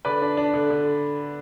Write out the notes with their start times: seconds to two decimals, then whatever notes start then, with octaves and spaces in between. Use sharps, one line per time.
0.05 D3 B4 D5
0.22 D4
0.37 D4
0.54 D3
0.70 D3